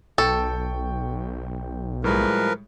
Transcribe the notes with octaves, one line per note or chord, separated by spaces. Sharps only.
B1 A4 G5 C#6
A2 F3 G3 G#3 A#4 B4